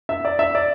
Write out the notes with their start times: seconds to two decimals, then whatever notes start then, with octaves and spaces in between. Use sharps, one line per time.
0.09 E5
0.25 D5
0.39 E5
0.55 D5